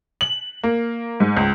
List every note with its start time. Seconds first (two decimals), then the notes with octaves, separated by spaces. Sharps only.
0.21 F#7
0.63 A#3
1.20 G#2
1.37 C#2